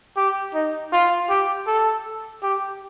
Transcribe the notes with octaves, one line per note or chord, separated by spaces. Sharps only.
G4
D#4
F4
G4
A4
G4